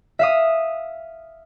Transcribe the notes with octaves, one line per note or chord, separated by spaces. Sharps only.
E5 F5 D#6